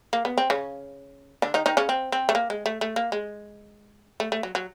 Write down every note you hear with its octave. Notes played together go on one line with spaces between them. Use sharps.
A#3
B3
C4
C#3 C#4
D3 D4
D#3 D#4
D#3 D#4
C#3 C#4
C4
C4
A3
A#3
G#3
A3
A3
A#3
G#3
A3
A3
F#3
F#3